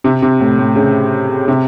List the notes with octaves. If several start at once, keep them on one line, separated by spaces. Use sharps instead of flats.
C3
C3
A2
A2
C#3
C3